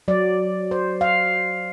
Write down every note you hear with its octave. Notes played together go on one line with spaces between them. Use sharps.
F#3 D5
C5
F5